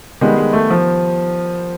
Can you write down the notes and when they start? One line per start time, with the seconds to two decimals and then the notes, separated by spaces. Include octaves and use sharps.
0.21 D#3 G3 G#3 B3
0.37 G#3
0.53 A3
0.70 F3